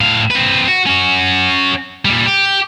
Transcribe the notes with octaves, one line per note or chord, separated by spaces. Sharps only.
A2 F5
C4 B4
F#4
C#4 F#4
A#2 G3
G4